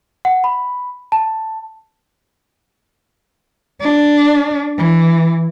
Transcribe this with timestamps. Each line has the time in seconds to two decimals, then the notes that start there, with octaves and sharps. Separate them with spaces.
0.25 F#5
0.44 B5
1.12 A5
3.81 D4
4.78 E3